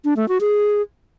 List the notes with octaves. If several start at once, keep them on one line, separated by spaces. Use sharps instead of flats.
D4
A3
F#4
G#4